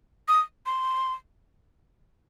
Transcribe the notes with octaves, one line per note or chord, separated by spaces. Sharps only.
D#6
C6